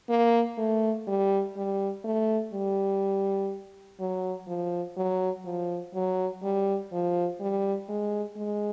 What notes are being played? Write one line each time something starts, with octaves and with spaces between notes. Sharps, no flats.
A#3
A3
G3
G3
A3
G3
F#3
F3
F#3
F3
F#3
G3
F3
G3
G#3
G#3